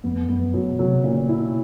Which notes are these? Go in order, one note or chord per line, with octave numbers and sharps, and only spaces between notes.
F2 B3
F#2 B3
B2 F#3
C#3
C3 F#3
A#2 C#3
B2 E4